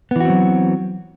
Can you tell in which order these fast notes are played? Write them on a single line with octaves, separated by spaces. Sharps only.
B3 E3 F#4 C4 F#3